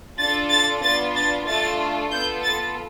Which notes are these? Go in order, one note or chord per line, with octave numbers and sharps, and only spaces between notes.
D4 F4 A4 A6
A6
B3 D4 F4 A6
A6
A3 D4 F4 A4 A6
B3 F4 A4 G6
A6